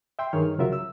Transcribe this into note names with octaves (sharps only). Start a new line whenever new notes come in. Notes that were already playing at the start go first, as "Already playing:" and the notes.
E5 G5 C6
G2 D#3 G#4 C#5 F6
C2 C#3 F#3 F4 A#4 E5
E6